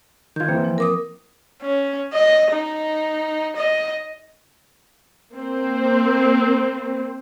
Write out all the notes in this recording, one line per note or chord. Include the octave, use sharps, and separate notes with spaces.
D#3 F4 G6 G#6
E3 A#3 C4
F3
A#4 D6 D#6
C#4
D#5
D#4
D#5
A#3 C4 C5